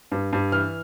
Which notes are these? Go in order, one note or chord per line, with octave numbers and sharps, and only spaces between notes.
G2
G2
E3 F6